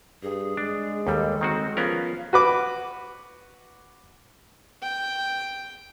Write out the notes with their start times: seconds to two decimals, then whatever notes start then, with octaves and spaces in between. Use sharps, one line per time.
0.23 G2 G#4
0.57 G#3 D4
1.07 D#2 G3 A4
1.41 D#3 C4 F#4
1.77 F3 B3 C#4 A#4 F5
2.33 F#4 B4 D6
4.83 G5